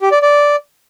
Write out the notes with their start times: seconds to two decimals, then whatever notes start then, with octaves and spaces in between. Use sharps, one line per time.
0.01 G4
0.11 D5
0.22 D5